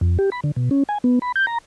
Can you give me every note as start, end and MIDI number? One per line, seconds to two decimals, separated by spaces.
0.01 0.18 41
0.19 0.30 67
0.32 0.40 83
0.44 0.51 50
0.56 0.69 47
0.71 0.83 61
0.89 0.98 80
1.04 1.19 59
1.22 1.32 83
1.36 1.46 91
1.47 1.58 82